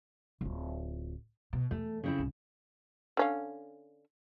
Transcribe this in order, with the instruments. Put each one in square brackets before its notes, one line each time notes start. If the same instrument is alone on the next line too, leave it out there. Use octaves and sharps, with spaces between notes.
[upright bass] D1 F4
B2
[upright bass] E2 [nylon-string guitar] A3
[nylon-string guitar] C#3 C4 E4
[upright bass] C2 G#2
[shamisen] D3 C#4 F5